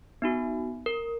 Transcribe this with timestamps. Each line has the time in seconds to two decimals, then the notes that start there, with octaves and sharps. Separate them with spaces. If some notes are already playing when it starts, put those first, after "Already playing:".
0.22 B3 D#4 F#4
0.86 A#4